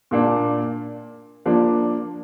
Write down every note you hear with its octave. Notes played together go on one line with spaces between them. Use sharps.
A#2 A#3 D4
F3 A#3 D4